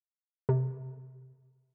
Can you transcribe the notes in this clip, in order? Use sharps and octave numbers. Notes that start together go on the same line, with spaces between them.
C3